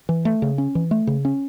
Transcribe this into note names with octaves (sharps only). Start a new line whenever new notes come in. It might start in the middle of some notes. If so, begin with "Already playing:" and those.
E3
A3
C#3
C#4
E3
A3
C#3
C#4